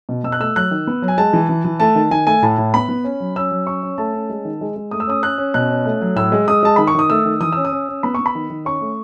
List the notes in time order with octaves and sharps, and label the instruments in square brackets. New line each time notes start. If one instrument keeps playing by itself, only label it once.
[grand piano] B2
B2 E6
F#6
A3 E6
F#3 F#6
D#3
B3
F#3
G#5
G#3 A5
E3
E3
E3
A3 A5
D#3
D#3 G#5
A3 G#5
A2 A5
A2
B3 B5
B3
C#4
F#3
C#4 E6
F#3
C#4 C#6
C#4
A3 A5
C#4
G#3
D#3
G#3
G#3
A3 D#6
E6
C#4 D#6
C#4 F#6
C#4
B2 F#6
C#4
A3
F#3
A2 E6
G#3
G#3 D#6
G#3 A5
D#3 B5
C#6
D#3 D#6
A3 E6
D#3
E3 D#6
C#4 E6
D#6
C#4
C#4
B3 B5
B3 C#6
B5
D#3
D#3
C#4 C#6
A3